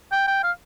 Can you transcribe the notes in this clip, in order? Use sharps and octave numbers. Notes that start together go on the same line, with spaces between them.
G5
G5
F5